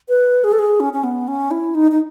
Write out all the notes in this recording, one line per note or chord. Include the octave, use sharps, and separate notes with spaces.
B4
G#4
A4
G#4
C#4
C#4
B3
C#4
E4
D#4
D#4